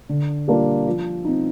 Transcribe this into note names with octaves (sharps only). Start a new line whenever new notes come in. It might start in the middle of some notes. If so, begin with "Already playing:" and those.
D3
G3 A#3 D4 F4
F3
C4 D#4